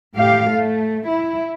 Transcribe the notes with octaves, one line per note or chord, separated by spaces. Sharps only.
A2 G4 F5
A3
E4